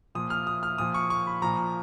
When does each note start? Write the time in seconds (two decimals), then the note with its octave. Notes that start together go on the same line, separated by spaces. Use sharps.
0.15 A#2 F3 D#6
0.30 F6
0.47 D#6
0.63 F6
0.78 A#2 F3 D#6
0.94 C#6
1.10 C#6
1.27 B5
1.42 A#2 F3 A#5